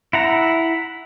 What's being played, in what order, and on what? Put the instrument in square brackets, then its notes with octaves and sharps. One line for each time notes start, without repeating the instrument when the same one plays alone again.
[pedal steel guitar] E4 F#5 A#5